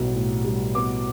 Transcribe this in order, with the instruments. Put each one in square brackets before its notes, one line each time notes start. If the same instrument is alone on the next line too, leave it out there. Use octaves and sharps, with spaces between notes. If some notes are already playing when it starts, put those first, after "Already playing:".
Already playing: [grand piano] B1 A2 G3 B3
A2
G3
B3 D6